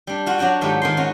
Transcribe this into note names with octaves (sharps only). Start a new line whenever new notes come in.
G3 D4
F4 F#4
F#3 D4 F#4 G5 A5
G#2 D#3 A3 F4 G4
D#3 G#4 C6
C#4 F4 F#4